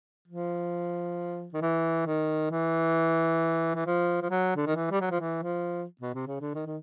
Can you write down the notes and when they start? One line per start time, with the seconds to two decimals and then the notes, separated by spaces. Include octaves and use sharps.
0.28 F3
1.53 D#3
1.62 E3
2.06 D#3
2.51 E3
3.75 E3
3.86 F3
4.22 F3
4.30 F#3
4.56 D3
4.67 D#3
4.76 E3
4.91 G3
5.01 F#3
5.11 F3
5.20 E3
5.43 F3
6.01 B2
6.14 C3
6.27 C#3
6.41 D3
6.55 D#3
6.66 D#3